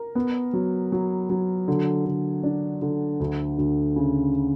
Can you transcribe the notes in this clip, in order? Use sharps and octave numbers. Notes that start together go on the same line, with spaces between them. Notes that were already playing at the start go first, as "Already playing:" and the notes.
Already playing: A#4
B3
F#3
F#3
F#3
D3
D3
D4
D3
D2
D2
C#3